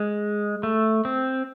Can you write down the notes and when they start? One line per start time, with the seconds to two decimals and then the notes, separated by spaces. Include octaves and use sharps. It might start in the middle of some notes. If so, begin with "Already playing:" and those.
Already playing: G#3
0.63 A3
1.05 C4